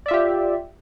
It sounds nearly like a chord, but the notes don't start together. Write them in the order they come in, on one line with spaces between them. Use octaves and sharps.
D5 E5 F4 G4